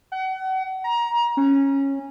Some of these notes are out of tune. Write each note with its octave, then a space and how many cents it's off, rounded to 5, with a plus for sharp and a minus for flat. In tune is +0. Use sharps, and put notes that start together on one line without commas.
F#5 +35
A#5 +25
C#4 -10